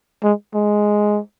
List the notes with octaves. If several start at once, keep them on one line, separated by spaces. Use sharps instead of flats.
G#3
G#3